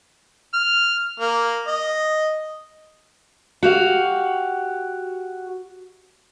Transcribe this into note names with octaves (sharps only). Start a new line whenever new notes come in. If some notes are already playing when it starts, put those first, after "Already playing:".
F6
A#3
D#5
F#4 G4 F5